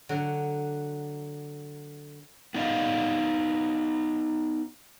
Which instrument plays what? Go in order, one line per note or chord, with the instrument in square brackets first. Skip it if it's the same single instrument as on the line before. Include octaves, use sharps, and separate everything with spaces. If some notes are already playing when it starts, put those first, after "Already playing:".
[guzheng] D3 F#3
[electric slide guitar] B3 D#4 D5 D#5 F5